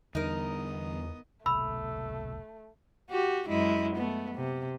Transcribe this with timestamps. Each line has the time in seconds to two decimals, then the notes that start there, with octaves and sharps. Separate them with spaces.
0.15 E2 D3 G3 B3 D#4 A#4 D#5
1.46 F1 C2 B2 A3 B5 E6
3.10 F#4 G4
3.49 F#2 G#3 E4
3.96 A3 B3
4.35 C3